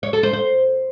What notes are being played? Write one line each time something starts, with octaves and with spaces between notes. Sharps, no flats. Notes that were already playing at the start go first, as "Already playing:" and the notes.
C#5
A4
C5
C5